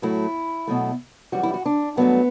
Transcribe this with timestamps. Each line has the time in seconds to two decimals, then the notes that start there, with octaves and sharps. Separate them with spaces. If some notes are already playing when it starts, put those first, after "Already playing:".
0.02 A2 F#3 A3 E4
0.67 B2 F#3 A3
1.32 F#2 E3 G3 F#4
1.43 E4
1.54 F#4
1.66 D4
1.97 G2 F#3 A3 B3